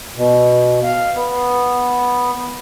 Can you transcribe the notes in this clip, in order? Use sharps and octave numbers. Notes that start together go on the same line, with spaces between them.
B2
F5
B3